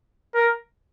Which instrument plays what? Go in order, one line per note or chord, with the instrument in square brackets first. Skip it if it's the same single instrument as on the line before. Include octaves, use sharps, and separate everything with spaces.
[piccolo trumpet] A#4